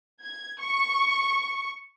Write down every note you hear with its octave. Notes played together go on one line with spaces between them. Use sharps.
G#6
C#6